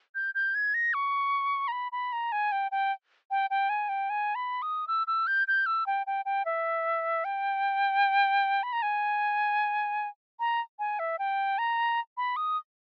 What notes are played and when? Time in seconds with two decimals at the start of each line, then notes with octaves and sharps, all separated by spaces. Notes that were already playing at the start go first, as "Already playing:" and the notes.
0.15 G6
0.35 G6
0.55 G#6
0.74 A#6
0.94 C#6
1.68 A#5
1.72 B5
1.92 B5
2.13 A#5
2.32 G#5
2.52 G5
2.72 G5
3.31 G5
3.50 G5
3.69 G#5
3.89 G5
4.10 G#5
4.35 B5
4.62 D#6
4.88 E6
5.07 E6
5.27 G6
5.48 G6
5.66 E6
5.86 G5
6.07 G5
6.25 G5
6.45 E5
7.25 G5
8.63 B5
8.73 A#5
8.82 G#5
10.40 A#5
10.79 G#5
10.99 E5
11.19 G5
11.58 A#5
12.17 B5
12.36 D#6